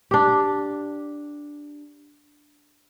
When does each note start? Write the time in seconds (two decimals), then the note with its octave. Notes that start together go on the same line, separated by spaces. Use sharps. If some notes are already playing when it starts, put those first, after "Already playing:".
0.11 D4 G4